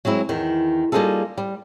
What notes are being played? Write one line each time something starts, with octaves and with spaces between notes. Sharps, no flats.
F#3 G#3 C4 E4
E2 D#3
G3 A#3 D#4 F4 G#4 A4
G3